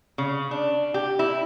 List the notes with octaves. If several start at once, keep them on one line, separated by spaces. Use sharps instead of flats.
C#3
D4
G4
E4